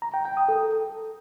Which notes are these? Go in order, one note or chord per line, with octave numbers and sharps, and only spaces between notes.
A#5
G5
G5
D#6
A4